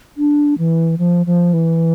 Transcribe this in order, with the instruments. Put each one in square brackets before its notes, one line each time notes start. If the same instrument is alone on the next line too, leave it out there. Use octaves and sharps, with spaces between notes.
[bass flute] D4
E3
F3
F3
E3